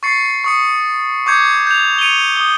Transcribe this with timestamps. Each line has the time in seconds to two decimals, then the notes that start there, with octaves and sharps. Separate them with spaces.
0.03 C#6 A6 C7 C#7
0.44 C#6 D#6 C#7
1.26 C#6 D6 G6 G#6 C#7
1.67 G6 F7
1.98 C#7 D#7 F7 G7
2.36 D#6 G7